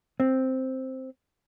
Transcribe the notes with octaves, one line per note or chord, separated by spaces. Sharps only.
C4